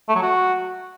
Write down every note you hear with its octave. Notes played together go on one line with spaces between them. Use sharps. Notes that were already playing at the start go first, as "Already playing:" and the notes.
A3
F#3
F#4